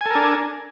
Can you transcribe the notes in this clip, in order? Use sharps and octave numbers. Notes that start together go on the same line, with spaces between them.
D4 A4 A#4 G#5